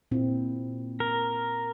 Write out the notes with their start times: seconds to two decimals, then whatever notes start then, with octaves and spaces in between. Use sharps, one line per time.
0.11 A#2 C4 E4
1.00 A#4